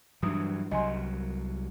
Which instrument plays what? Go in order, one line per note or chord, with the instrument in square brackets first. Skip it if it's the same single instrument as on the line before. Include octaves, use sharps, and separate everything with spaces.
[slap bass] G2 E3 F#3 [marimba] D4 D#6
[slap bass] C2 F#3 [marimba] D#5 G#5 C6